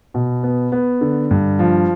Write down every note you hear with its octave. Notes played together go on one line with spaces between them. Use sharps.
B2
B3
B3
D3
G2
F3